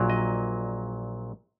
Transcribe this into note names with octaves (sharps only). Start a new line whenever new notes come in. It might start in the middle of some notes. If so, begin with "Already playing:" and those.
Already playing: A#1 A#2 F#3
D#5